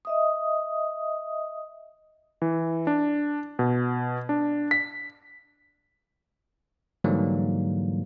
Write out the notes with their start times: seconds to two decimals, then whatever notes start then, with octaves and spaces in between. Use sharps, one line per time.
0.05 D#5 E5 D#6
2.42 E3
2.87 D4
3.59 B2
4.29 D4
4.71 B6
7.04 G#2 D3 E3 F#3 G3 A#3